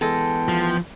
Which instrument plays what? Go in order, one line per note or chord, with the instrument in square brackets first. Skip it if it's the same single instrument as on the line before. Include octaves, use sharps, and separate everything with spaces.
[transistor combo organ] E3 B3 G5 [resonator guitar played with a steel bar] G#3 A4
[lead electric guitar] F3